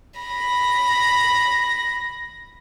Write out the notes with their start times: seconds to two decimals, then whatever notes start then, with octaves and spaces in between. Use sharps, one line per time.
0.20 B5 A#6